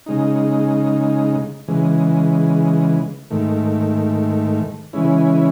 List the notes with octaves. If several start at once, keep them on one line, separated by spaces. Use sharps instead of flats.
C#3 G#3 D#4
C#3 E3 G#3
G#2 D#3 A3
C#3 E3 G#3 C#4 E4